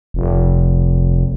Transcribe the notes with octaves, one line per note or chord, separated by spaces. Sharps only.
F1